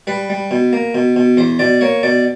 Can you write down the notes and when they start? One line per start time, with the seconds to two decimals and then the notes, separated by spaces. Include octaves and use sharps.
0.07 G3 B4
0.30 G3
0.51 B2
0.73 A#3
0.95 B2
1.16 B2
1.37 E2 C5
1.59 B2 D5
1.81 A#3 C#5
2.03 B2 D5